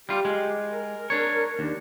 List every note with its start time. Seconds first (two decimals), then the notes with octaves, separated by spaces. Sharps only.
0.09 G3 F4 G4
0.25 G#3
0.71 A#4
1.10 D4 C#5
1.59 D#2 D4